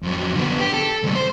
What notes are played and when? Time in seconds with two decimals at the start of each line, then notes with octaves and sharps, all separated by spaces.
0.03 F2 F#3
0.36 D3 B3
0.59 G4
0.74 A4
1.03 D2 G3
1.15 C5